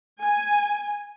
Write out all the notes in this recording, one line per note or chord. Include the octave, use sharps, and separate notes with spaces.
G#5